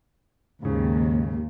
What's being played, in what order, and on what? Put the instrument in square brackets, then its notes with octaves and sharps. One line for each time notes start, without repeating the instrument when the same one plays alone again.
[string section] D#2 [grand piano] G#2 C#3